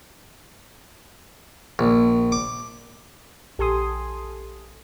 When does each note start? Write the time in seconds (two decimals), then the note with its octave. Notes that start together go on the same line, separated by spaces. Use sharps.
1.79 A#1
2.32 D6
3.59 A#1 G4 A4 G#5 C6 D#6